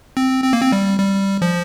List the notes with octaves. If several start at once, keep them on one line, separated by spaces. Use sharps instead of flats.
C4
C4
A#3
C4
G3
G3
F3